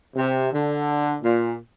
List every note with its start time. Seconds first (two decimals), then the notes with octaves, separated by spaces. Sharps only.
0.16 C3
0.52 D3
1.23 A#2